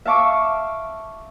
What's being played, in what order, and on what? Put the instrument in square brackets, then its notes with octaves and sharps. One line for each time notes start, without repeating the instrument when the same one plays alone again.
[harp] E5 F5 A5 C#6 D6 E6